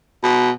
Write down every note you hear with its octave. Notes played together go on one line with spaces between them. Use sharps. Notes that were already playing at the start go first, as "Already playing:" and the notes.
B2